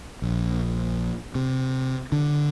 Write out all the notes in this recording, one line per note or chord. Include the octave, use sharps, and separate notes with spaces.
A#1
C3
D3